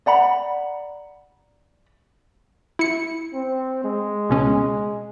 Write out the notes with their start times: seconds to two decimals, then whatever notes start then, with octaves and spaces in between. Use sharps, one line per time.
0.06 D5 F#5 A#5 B5
2.79 E4 C#7
3.34 C4
3.84 G#3
4.29 C#2 B2 C#4